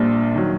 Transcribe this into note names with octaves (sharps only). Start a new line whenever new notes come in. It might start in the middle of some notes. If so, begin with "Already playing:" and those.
Already playing: A#1 A#2 G3 D4
D#3 F#3